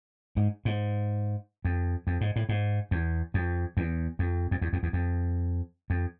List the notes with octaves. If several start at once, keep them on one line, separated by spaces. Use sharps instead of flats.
G#2
G#2
F2
F2
G#2
A2
G#2
E2
F2
E2
F2
F2
E2
F2
E2
F2
F2